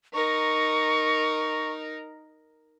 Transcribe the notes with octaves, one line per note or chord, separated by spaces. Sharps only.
D#4 A#4 C#6